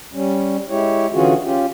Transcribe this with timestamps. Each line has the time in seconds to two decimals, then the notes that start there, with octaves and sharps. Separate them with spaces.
0.13 G3 C#4
0.69 G#3 E4 G4 C#5
1.13 D3 E3 C#4 F4 F#4 G#4
1.44 C#4 F4 G4